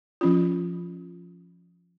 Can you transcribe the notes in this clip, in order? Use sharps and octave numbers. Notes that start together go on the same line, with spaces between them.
F3 C#4 F4